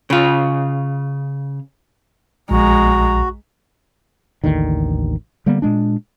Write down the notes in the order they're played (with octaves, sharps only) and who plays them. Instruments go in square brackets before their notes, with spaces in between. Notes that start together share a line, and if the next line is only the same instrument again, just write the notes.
[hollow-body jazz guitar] C#3 F4
[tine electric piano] A#1 [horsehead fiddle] G#3 A#5 [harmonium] F#4
[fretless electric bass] A1 D#2 D3 D#3
D3 G3 A#3 B3
A#2 G#3 D4